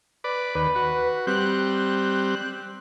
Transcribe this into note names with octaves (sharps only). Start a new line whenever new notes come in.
B4 D5
D#2 B4
F#4
G3 C4 F#6